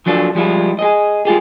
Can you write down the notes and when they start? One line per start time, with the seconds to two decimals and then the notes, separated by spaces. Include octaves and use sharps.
0.06 F3 F#3 D4 F4 A4
0.35 F3 G3 G#3 E4 F4
0.79 G#4 D#5
1.25 G#3 F4 G4 G#4